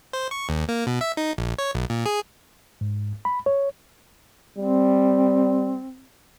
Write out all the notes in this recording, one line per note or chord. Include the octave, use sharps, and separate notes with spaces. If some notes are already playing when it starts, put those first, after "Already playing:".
C5
C#6
D#2
A#3
B2
E5
D#4
A#1
C#5
B1
A#2
G#4
G#2
B5
C#5
G3 C4